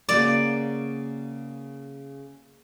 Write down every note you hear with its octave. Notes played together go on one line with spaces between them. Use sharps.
C#3 A#3 F#4 D5